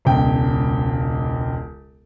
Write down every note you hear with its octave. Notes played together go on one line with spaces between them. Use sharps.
E1 C#2 G5